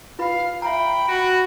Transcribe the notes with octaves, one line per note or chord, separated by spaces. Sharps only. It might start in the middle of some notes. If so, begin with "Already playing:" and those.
F4 B4 F5 B5
E5 G5 A#5 B5
F#4